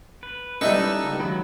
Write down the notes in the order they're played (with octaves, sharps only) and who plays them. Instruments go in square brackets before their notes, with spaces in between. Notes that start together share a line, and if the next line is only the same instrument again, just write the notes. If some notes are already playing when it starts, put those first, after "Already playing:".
[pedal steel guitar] B4
[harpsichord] G3 E4 B4 [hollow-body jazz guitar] C#4 D#5 [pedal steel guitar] D#4 A4
[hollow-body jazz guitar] C#2
[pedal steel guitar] D#3 F#3 B5